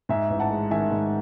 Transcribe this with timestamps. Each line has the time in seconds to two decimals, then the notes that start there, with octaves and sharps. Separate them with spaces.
0.09 G#2 E5 G#5
0.30 A1
0.40 F#5 A5
0.51 G#3
0.71 D#3 E5 G#5
0.91 G#2